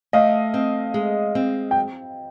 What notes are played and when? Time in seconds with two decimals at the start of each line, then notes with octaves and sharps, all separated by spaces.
0.13 A3 D#5 F5
0.54 C4
0.94 G#3
1.35 C4
1.71 G5